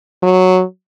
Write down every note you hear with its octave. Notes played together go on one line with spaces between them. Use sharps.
F#3